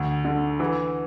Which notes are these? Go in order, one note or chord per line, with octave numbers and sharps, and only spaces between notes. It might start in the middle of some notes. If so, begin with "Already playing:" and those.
Already playing: D2
D3
E3